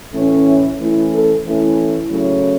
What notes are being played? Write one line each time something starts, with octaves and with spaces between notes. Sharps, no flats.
A2 E3 A3 C#4
E4
E3 A3 C#4 E4
A4
E3 A3 C#4 E4
C#3 F#3 A3 C#4